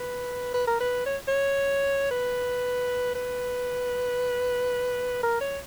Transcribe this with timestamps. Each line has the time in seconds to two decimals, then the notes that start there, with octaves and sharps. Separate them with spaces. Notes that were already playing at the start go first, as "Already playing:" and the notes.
Already playing: B4
0.54 B4
0.67 A#4
0.80 B4
1.06 C#5
1.28 C#5
2.11 B4
3.15 B4
5.23 A#4
5.41 C#5